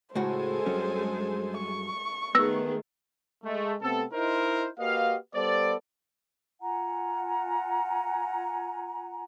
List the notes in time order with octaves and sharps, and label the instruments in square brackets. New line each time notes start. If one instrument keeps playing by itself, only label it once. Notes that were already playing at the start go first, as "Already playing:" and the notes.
[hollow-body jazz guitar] C#2 A2 F#4 [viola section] G#3 A4 G#5 [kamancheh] C5
[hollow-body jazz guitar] G2 F#3 C#4
[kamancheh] C#6
[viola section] D#3 A3 G#4 [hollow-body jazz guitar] B3 [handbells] E6 A#6
[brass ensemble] G#3 A3
C3 A3 B3 C4 A4
D#4 E4 A#4 C5
A#3 F#4 G4 B4 D#5 F5
G3 B3 A4 C5 D5
[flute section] F4 F#5 G#5 A#5